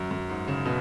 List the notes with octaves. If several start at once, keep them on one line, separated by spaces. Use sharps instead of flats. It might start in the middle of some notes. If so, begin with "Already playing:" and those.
Already playing: F#2
F#2
G#2
C#3
B2